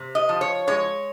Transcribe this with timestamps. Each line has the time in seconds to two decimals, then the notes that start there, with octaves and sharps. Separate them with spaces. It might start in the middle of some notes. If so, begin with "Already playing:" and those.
Already playing: C3
0.15 D#5
0.29 F3
0.41 C#5
0.67 G#3 C#5